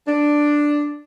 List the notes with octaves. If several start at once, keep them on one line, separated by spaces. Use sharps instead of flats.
D4